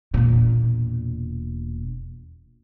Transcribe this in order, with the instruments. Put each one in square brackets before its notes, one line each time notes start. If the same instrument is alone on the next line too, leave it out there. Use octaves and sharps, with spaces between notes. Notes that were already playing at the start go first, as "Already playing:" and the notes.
[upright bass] E1 A#2